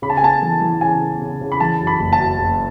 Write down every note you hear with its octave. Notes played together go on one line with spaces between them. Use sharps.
C#3 B5
A5
G#5
B3 A5
E3
E3
C#3 G#5
B3
C#3
C#3
B5
E3 A5
F#2
B5
F#1
A5
F#2
F#1